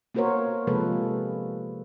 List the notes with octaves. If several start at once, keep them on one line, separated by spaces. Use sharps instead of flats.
A#3 B3 F#4 A#4 C5 C#5
C3 F3 G#3 A#3 A4 B4